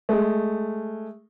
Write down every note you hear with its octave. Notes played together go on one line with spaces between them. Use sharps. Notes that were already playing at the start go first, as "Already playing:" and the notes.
G#3 A3